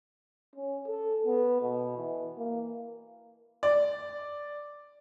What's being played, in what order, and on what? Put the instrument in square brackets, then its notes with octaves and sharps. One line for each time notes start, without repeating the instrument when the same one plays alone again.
[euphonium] C#4
A4
B3
B2
E3
A#3
[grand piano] D5